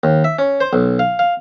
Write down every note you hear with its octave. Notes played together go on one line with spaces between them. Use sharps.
D#2
E5
C#4
C5
B1
F5
F5